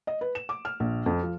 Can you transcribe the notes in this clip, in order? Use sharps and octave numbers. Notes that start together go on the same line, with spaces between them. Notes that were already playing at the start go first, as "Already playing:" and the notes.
D#5
B4
E7
D6
F6
A#1
F2
F3